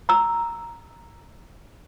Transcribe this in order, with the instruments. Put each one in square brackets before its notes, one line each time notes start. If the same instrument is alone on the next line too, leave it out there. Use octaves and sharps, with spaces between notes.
[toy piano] A#5 E6